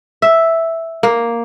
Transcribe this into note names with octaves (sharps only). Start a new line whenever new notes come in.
E5
A#3